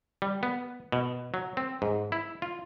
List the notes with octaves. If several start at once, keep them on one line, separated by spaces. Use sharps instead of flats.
G3
B3
B2
F#3
C4
G#2
E4
F4